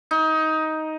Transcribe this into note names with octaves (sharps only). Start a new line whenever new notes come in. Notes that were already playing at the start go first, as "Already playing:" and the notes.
D#4